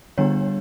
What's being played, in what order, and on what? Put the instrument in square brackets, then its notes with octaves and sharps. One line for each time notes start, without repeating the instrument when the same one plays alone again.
[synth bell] D3 G3 B3 D4 C#5